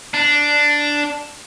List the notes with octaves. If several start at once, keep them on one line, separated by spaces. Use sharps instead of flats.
D4